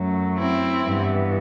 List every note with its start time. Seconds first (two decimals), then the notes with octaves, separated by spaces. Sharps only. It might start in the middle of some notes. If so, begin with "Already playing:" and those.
Already playing: F#2 F#3 A3
0.38 C4 E4
0.84 G2 E3 B3